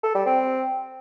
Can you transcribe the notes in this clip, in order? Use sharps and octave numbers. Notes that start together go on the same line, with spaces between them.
A4
G3
C4